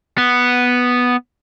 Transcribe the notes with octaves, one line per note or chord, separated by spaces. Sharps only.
B3